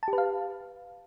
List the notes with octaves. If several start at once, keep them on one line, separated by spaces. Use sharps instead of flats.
A5
G4
B4
F5